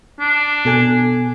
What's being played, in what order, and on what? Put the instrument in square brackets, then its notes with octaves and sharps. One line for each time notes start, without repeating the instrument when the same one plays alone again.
[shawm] D4
[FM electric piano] B2 A4 G#5